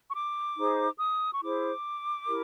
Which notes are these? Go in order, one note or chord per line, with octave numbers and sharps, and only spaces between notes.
C#6
D6
D#4 G#4 C5
D#6
C#6
E4 G#4 C5 D6
E4 G4 A#4